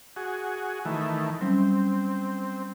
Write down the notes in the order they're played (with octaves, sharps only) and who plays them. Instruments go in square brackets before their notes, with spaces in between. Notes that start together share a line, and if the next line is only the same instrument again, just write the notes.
[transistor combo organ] F#4 G#4
D#3 E3 A3
[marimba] F#3 G3 C#4 [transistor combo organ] C4